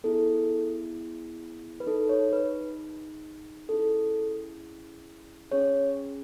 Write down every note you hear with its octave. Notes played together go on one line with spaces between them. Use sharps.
B3 E4 G#4 A4
B4
D#4 G#4 A4
C#5
B4
C#4 E4 G#4 A4
C#4 G#4 C#5